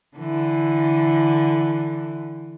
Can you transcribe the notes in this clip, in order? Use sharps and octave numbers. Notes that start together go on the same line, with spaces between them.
D3 E3